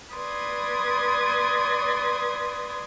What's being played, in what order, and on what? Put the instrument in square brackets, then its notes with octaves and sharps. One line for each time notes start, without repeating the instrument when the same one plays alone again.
[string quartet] B4 D5 C6 D#6 G#6